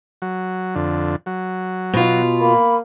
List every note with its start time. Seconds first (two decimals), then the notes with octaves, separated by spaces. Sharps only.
0.22 F#3
0.75 F2 D3
1.26 F#3
1.93 B2 F4
2.41 A#3 B5